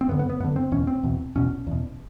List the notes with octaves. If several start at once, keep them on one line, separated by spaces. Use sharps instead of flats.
C4
F#2 D3 B3
B3
B3
F#2 D3 B3
C4
E2 B2 C#4
C4
E2 B2
E2 B2 C#4
E2 B2